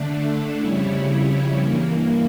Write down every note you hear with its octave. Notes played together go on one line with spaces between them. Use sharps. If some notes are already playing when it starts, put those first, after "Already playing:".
Already playing: D3 A3 D4
F2 C#3 G3 C#4 E4
G2 E3 A#3